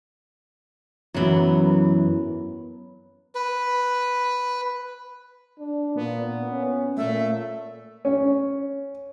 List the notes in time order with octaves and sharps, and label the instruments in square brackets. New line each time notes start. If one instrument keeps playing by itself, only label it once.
[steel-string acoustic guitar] F#2 E3 [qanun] F#3 B3
[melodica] B4
[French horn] D4
[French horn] A#2 [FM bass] B3
[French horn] C#4
[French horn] A#2 [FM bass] A3 [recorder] E5
[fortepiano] C#4